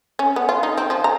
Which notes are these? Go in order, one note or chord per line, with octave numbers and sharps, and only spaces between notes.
C#4
B3
F4
D#4
C4
F3
A#5